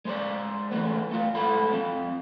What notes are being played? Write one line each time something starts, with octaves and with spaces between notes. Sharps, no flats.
G#3 C5 D5
D3 E3 F3 A3 B3
A3 F4
A2 G#3 A4 F#5 B5
F3 C4